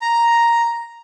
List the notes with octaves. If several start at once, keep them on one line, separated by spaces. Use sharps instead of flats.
A#5